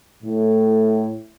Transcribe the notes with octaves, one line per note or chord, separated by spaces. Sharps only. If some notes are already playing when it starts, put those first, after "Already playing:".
A2